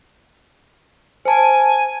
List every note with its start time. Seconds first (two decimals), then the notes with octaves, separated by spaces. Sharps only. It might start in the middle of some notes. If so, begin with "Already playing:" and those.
1.25 C5 G#5 A5